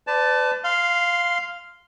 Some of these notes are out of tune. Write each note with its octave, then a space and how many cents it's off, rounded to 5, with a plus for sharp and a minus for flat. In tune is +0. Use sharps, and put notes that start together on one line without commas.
B4 +40 D5 +0 A5 +0
F5 +0 C6 -15